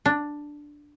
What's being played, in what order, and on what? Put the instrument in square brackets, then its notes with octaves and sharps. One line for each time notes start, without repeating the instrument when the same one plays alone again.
[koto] D4